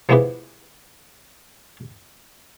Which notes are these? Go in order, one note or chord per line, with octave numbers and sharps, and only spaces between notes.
F3 G#3 B3 E4 G4 B4